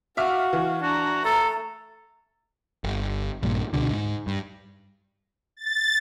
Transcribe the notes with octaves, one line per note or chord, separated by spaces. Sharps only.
F#4 E5 F5 D6 F6
E3
D4 F#4 A#5
A3 A4 A#5
G1
A#1 G2 A#2
C#2 B2 D3
G#2
G2
A6